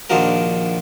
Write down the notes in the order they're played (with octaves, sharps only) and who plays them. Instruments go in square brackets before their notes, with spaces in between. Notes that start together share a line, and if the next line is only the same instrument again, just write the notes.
[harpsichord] A#1 D#3 F3 D4 F#4 A#4